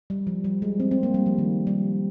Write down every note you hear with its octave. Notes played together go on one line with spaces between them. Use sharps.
G3
F3
G3
G#3
C4
C4
A#3
G3
F3
D#3
G3